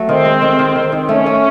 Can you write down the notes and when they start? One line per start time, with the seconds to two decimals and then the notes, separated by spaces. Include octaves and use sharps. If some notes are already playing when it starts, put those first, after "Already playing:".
Already playing: F#3 A3
0.08 D#3 C4
0.25 G#3
0.42 D#3
0.59 D#3
0.75 D#3
0.92 D#3
1.09 A3 C#4
1.26 A3